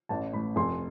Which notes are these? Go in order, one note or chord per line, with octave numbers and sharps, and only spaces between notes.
A1 A5
A2 E3 A3 B5
F1 C6